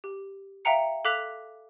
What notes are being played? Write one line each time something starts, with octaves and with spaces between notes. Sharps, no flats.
G4
E5 F5 G5 A#5 C#7
A4 F5 D6 F#6 B6 F7